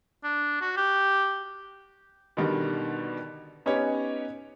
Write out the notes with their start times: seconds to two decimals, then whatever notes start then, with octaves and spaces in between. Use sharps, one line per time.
0.24 D4
0.61 F#4
0.77 G4
2.37 B2 D3 D#3 G3
3.66 B3 C#4 D#4 G4 B4 C#5